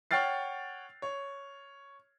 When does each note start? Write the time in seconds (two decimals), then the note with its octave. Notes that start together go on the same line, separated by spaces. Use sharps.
0.11 C#5 F#5 G5 F6 A6 C7
1.02 C#5